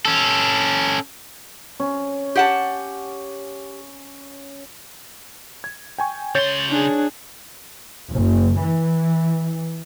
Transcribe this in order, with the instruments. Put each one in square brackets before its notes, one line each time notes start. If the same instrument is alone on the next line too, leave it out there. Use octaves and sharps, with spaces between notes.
[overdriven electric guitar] C#4 A4
[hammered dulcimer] C#4
[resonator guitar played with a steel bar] G4 F#5 A5
[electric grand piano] G#6
G5 G#5 C#6
[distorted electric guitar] C#3 C6 [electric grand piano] C#5 G6 A6
[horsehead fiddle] D4 G#4
[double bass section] F#1
E3